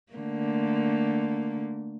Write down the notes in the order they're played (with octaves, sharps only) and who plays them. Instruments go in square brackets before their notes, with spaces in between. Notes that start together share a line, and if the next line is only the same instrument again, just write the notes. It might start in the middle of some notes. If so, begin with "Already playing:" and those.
[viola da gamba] D3 A3 A#3